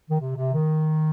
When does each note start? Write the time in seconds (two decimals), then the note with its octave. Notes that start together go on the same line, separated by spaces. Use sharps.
0.09 D#3
0.20 C3
0.36 C3
0.52 D#3